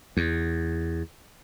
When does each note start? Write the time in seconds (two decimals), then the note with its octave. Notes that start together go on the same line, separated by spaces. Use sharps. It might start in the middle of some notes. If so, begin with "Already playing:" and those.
0.17 E2